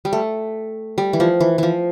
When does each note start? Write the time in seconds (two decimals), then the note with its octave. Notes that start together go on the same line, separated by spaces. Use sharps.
0.05 G3
0.13 A3
0.98 G3
1.13 E3
1.20 F3
1.41 E3
1.58 E3 F3